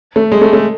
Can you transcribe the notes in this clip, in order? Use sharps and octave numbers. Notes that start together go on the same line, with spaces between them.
A3
G#3
A3
A3